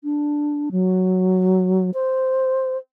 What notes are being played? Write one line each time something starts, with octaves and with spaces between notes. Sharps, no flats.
D4
F#3
C5